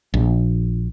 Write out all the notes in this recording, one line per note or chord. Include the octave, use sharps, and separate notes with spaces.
A#1